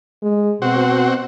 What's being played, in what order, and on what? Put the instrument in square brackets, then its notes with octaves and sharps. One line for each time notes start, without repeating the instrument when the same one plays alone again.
[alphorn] G#3
[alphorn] B2 [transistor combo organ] C4 F#4